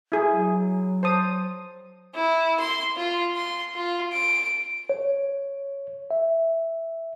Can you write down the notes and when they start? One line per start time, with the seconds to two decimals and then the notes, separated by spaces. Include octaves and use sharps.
0.12 E4 G#4
0.31 F#3
1.03 C5 A5 D#6
2.14 E4
2.60 C6
2.97 F4
3.35 C6
3.74 F4
4.13 D7
4.90 C#5
6.11 E5